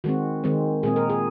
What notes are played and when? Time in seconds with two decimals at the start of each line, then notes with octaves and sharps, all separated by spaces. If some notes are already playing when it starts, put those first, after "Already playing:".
0.04 D#3 G#3 C4 F#4
0.44 D#3 G#3 C4
0.83 A#2 G#3 C4 G#4
0.96 A#4
1.10 G#4